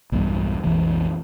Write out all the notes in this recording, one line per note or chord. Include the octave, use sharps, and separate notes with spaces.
B1 E2 G2 B2
B1 F2 E3 A3